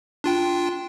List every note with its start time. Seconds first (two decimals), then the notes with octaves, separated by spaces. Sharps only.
0.24 D4 F4 G5